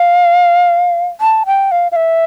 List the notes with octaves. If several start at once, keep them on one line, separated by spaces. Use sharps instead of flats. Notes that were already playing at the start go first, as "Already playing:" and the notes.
Already playing: F5
A5
G5
F5
F5
E5